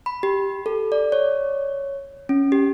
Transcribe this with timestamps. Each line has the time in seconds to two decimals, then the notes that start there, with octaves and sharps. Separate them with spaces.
0.06 B5
0.23 G4
0.66 A4
0.92 D5
1.12 C#5
2.29 C#4
2.52 G4